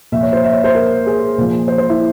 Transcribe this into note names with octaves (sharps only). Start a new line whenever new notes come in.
A#2 F3 E5
C#5
C5
E5
C#5
C5
A#4
G#4
A#2 F3
C5
C5
E4